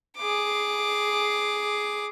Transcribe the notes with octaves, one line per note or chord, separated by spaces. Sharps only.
G#4 D6